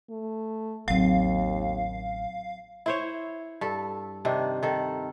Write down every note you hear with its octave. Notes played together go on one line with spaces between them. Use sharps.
A3
A1 D#2 F#3 C4 F5
E4 C5 C#5
G2 A4
C3 D#3 D4
D#3 A4